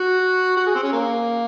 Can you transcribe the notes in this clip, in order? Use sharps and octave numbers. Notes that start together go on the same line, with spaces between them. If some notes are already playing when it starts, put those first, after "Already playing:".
Already playing: F#4
F#4
G#4
C4
C#4
A#3